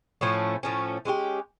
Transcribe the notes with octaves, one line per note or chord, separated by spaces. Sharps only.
A2 F3 A3 C#4
A2 F3 A3 C#4
G#3 C#4 E4 G4